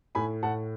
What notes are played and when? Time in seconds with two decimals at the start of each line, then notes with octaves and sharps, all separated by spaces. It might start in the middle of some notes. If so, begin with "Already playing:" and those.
0.15 A2 G#5 B5
0.43 A2 F#5 A5